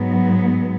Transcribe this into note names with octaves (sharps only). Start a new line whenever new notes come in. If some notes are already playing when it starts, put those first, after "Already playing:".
Already playing: G#2 F#3 B3